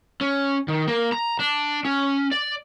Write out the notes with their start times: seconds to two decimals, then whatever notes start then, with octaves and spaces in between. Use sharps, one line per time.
0.21 C#4
0.68 D#3
0.88 A#3
1.12 A#5
1.40 D4
1.85 C#4
2.32 D5